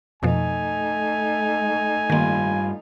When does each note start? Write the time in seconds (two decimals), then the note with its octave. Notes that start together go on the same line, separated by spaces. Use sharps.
0.23 F2 B2 F3 A3 D#4 G#5
2.10 G2 D#3 G3 A#3 F4